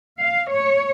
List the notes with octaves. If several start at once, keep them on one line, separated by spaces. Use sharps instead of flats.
F5
C#5